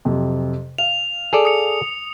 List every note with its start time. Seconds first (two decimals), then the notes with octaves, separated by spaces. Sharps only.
0.05 F2 C3 F#3
0.78 F5 F7
1.33 G#4 A4 D5
1.45 D#6 C#7